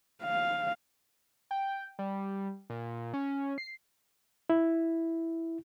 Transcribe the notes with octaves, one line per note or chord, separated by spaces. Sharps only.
F5
G5
G3
A#2
C#4
C7
E4